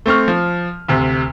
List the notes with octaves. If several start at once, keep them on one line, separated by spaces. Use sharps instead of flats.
A3 C4 C#6 F6
F3
D2 C3